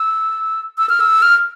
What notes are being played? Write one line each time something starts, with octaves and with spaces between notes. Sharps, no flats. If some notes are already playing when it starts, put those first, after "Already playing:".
Already playing: E6
E6
F6
E6
F6